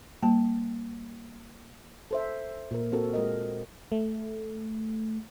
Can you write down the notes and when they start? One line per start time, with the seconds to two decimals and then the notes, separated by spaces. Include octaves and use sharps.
0.23 G3 A#3 A5
2.11 A4 C5 E5
2.71 A#2 A#4
2.92 C4 F#4 A4 A#4
3.13 G#3 A#4 D#5
3.92 A3